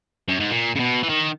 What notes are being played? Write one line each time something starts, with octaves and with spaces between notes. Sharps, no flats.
F#2
G#2
A#2
C#3
B2
E3
D#3